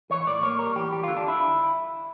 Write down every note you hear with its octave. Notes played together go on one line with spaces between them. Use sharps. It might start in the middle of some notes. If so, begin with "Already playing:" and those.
E3 C#5
A2 D5
A#3 C#5
G3 A#4
E3 G4
G3 G4
F4
D3
D4
E4